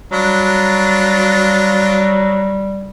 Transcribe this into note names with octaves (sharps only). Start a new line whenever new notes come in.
F#3 G3 D4 F4